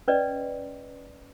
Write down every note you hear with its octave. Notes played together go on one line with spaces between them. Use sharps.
C#4 B4 D5 D#5